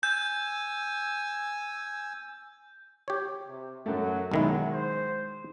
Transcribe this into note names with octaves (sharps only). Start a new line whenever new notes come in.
G#5 E6 G6
G4 C#5
C3
F#2 F#3 A3
B1 D#3 F#3 G#3 E4
C5